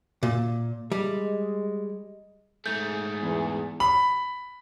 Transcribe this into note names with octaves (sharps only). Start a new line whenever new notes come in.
A#2
G3 G#3
G#2 A3 G#4 G6
E2
B5